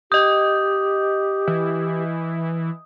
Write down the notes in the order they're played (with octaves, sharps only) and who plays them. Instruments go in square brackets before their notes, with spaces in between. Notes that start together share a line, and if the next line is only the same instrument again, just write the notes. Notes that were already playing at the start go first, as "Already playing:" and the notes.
[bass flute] G4 [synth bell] D#5 G6 [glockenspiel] D#6
[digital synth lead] E3